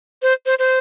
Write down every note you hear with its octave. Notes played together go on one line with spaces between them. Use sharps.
C5
C5
C5